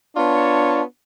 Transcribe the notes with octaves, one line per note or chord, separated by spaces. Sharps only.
B3 D4 F4 C#5 A5